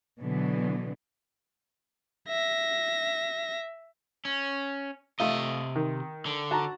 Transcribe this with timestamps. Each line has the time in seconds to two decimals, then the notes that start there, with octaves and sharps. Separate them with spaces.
0.20 B2 D3 E3 F#3 B3
2.28 E5 A#6
4.25 C#4
5.20 C3 A3 F4 D#5
5.76 D#3
6.26 D3
6.51 F#4 A5 A#5